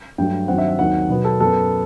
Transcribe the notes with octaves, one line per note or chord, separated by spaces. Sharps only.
G2 F#3 A3 G5
G2 D#3 F#3 C4 F#5
E5
E5
D#2 D#3 F#3 C4 F#5
B2 F#3 B3
A4
F#2 F#3 B3 A4